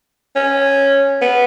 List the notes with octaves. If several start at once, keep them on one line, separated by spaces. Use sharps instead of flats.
C#4
B3